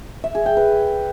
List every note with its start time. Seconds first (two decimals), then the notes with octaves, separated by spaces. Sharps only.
0.24 E5
0.35 G#4
0.46 G5
0.57 B4